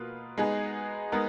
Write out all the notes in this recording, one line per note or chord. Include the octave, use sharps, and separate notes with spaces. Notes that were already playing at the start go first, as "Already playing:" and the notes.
Already playing: B2 A#3 F4 B4
G#3 B3 D#4 G#4 B4
G#3 B3 D#4 A#4